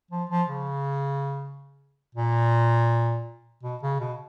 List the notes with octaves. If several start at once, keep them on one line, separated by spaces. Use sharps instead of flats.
F3
F3
C#3
A#2
B2
C#3
B2